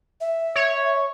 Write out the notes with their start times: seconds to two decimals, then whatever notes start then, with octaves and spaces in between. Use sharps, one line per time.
0.21 E5
0.55 C#5